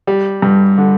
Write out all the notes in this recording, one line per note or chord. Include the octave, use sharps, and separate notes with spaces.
G3
G2
D3